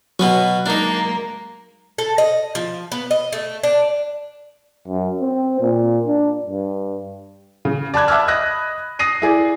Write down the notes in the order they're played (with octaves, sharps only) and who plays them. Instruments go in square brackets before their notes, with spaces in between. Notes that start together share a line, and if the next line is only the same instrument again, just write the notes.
[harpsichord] B2 B3 C#4 [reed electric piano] F#3
[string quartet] G#3 A#3 [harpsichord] D4 D#4
[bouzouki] A4
D#5
F3
B3
D#5
A3
D4
[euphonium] F#2
C4
A#2
D4
G2
[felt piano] C#3
D5 A5 B5 F#6 G#6
E5 A5 D6 E6 F6
D#5 B5 D#6 F#6 A#6
D#6 A#6 C7 D#7
E4 G#4 D5